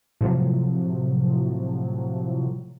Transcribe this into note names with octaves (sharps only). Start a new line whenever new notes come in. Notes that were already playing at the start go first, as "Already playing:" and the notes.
A2 C3 F3 F#3